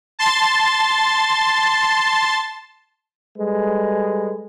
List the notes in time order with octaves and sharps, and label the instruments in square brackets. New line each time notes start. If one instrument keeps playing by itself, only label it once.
[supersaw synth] A5 C6 A6
[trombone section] G3 G#3 A4 B4